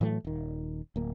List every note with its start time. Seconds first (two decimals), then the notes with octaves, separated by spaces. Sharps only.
0.01 A2 E3 F#3 A3
0.25 D#1 D#3
0.96 D1 A#3